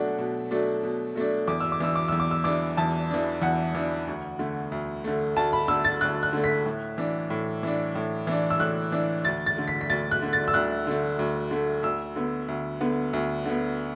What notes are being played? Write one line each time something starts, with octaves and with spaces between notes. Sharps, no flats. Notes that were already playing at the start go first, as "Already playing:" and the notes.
Already playing: B2 F#3 A3 D4 F#5
B2
F#3 A3 D4
B2
F#3 A3 D4
E2 D6
E6
D6
E3 D4 E6
D6
E2 E6
D6
E6
E3 D4 D6
E2 A5
E3 D4
E2 F#5
E3 D4
D2
D3 A3
D2
D3 A3
D2 A5
B5
D3 A3 E6
A6
D2 F#6
F#6
D3 A3
B6
A2
E3 D4
A2
E3 D4
A2
E3 D4
E6
A2 F#6
E3 D4
D2 A6
A6
D3 A3
B6
B6
D2 A6
F#6
D3 A3
A6
E6
D2 F#6
D3 A3
D2
D3 A3
D2 E6
D3 B3
D2
D3 B3
D2
D3 B3